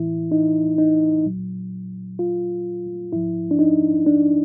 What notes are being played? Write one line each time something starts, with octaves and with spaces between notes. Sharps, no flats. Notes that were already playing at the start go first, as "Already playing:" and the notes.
Already playing: A2 E3 E4
D#4
D#4
A#2 F#3
F4
G#2 F3 E4
D4
D#4
D4